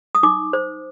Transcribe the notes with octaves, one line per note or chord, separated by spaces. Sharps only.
D#6
D#4 D6
C5